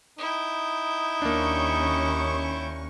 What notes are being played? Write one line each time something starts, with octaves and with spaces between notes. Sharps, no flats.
D#4 E4 G5
D#2 A#3 C#4 D4 C#6